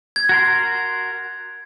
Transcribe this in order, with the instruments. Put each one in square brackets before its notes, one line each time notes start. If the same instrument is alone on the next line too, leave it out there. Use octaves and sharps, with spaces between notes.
[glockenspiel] G#6
[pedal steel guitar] F#4 A#4 C6